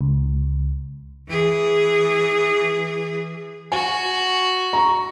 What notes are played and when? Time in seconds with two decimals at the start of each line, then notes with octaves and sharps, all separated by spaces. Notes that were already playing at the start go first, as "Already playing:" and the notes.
0.01 C#2
1.28 E3 G#4
3.72 F#4 G#5
4.73 A#5 C#6